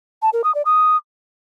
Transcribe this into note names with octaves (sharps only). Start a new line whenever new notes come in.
A5
A#4
D#6
D5
D#6